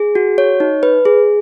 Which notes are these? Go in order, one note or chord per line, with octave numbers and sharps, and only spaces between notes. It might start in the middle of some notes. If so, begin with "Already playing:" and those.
Already playing: G#4
F#4
C#5
D#4
B4
G#4